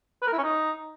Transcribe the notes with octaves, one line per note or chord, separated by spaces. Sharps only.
B4
A#4
E4
C#4
D#4